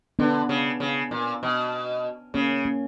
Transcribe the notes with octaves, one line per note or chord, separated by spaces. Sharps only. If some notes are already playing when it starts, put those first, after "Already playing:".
D3 B3 D4
C#3
C#3
A#2
B2
C#3 A#3 C#4
A#3 C#4